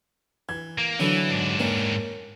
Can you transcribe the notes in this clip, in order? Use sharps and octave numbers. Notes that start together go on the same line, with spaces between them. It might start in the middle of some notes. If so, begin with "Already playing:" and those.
E3 G#6
A#3
D3 E3 F#3 A3 B3
G#2 D4
D#3 A#3 C#4